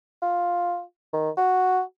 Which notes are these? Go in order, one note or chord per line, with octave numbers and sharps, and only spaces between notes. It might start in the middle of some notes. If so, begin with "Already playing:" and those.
F4
D#3
F#4